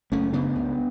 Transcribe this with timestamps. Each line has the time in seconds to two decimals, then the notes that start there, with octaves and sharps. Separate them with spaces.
0.12 F#1 A3 C#4
0.33 C#3 B3 D4
0.56 C#2